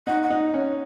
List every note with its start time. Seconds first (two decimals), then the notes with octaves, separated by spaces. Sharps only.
0.07 D#4 F#5
0.23 F#5
0.30 D#4
0.54 C#4